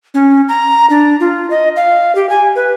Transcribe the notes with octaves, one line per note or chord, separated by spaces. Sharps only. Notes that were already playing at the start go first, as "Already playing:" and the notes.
C#4
A#5
D4
F4
D#5
F5
G4
G#5
B4